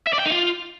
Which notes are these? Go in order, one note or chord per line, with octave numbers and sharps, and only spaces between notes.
E5
D5
G5
D#4
F4